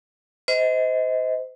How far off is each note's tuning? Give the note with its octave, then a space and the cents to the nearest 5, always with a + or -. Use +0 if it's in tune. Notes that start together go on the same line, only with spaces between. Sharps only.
C5 -25 D#5 +25